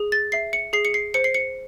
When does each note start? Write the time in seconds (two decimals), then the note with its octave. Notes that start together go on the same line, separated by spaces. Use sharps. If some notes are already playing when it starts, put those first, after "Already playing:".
Already playing: G#4
0.12 A6
0.32 E5 C7
0.53 C#7
0.73 G#4 C7
0.85 C#7
0.94 C7
1.14 C5 C#7
1.24 C7
1.35 C#7